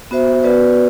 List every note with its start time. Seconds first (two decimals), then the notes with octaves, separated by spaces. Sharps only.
0.11 B3 F#4 C5 E5
0.43 B3 F#4 B4 D5